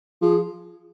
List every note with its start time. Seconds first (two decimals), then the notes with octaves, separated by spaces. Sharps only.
0.22 F3 G#4